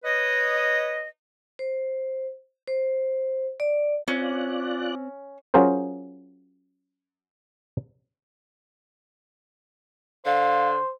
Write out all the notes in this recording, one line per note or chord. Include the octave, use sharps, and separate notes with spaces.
B4 C#5 D#5
C5
C5
D5
C4 C#4 F4 D5 F#6
F#3 C#4 F4 G#4 A#4 C5
D3 C5 F5